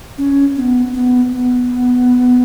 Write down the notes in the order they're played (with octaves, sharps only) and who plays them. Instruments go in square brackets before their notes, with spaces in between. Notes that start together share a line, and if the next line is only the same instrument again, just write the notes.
[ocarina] C#4
C4
B3
B3
B3